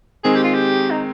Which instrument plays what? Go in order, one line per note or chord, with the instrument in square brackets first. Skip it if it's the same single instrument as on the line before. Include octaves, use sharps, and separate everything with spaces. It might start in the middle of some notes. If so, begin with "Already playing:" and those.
[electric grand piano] D#3 G#3 C4 [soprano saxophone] G#4
[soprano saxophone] G4
F4
G4
D#4